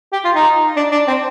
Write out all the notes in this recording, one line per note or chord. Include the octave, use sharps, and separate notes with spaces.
G4
F4
D#4
D4
D4
C4